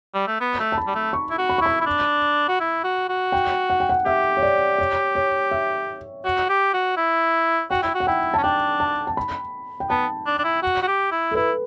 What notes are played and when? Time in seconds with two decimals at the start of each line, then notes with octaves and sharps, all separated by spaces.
0.14 G3
0.27 A3
0.40 B3
0.59 A3
0.72 A5
0.78 B5
0.87 G3
0.95 A3
1.13 C#6
1.30 E4
1.38 F#4
1.49 B5
1.58 C#6
1.62 E4 B5
1.81 E4
1.86 D4
2.48 F#4
2.60 E4
2.84 F#4
3.09 F#4
3.32 G5
3.70 F#5
3.80 G5
3.89 F#5
4.05 G4 E5
4.37 C#5
4.43 D5
4.78 C#5
5.15 C#5
5.51 E5
6.25 F#4
6.49 G4
6.74 F#4
6.97 E4
7.71 F#4 G5
7.83 E4
7.94 F#4
8.00 F#5
8.07 E4 G5
8.34 C#4 A5
8.43 D4 G5
8.80 A5
9.07 A5
9.17 B5
9.80 G5
9.90 B3 A5
10.26 D4
10.39 D4
10.44 E4
10.63 F#4
10.82 F#4
10.87 G4
11.11 E4
11.31 A4
11.35 E4 B4